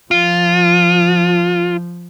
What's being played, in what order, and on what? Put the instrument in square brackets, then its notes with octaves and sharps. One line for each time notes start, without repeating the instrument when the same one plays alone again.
[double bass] F3 [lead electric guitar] F4